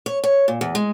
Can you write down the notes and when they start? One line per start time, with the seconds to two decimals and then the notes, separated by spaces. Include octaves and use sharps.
0.06 C#5
0.24 C#5
0.48 A#2
0.61 E2
0.75 G#3